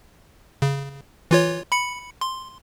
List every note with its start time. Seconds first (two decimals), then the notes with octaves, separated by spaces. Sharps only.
0.62 C#3
1.31 E3 F4 C#5
1.72 B5 C#7
2.21 C6